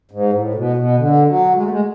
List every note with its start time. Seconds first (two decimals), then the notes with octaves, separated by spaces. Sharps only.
0.11 G#2
0.33 A2
0.55 B2
0.76 B2
0.98 D3
1.27 F#3
1.56 G#3
1.63 A3
1.71 G#3